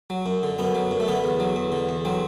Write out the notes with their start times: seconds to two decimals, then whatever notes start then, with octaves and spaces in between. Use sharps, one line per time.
0.10 F#3
0.26 F#2
0.43 D3
0.59 F#2 B3
0.75 F#3
0.91 F#2
1.00 A3
1.08 D3 B3
1.24 E2
1.40 F#3
1.56 E2
1.72 D3
1.89 E2
2.05 F#3 C4